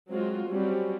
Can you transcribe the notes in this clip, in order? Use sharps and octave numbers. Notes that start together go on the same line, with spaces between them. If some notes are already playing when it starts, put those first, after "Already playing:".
F#3 G#3 C4 F4 F#4
F#3 G3 C4 C#4